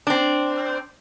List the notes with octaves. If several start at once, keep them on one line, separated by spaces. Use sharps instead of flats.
C4 D4